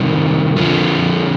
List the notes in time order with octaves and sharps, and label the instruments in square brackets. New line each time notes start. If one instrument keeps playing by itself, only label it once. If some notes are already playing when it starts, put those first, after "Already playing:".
Already playing: [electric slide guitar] C3 D#3 G3
F2 D3 F3